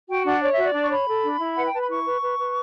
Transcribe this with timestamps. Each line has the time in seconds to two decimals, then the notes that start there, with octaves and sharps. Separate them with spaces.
0.08 F#4 G5
0.25 D4 F#5
0.41 C#5 D5
0.53 F#4 E5
0.63 D5
0.75 D4
0.82 C#6
0.90 C#5 B5
1.08 A4
1.23 D4
1.40 E4
1.56 B4 F#5
1.65 G5
1.72 B4 A5
1.80 B5
1.89 E4 C#6
2.05 B4
2.21 B4
2.38 B4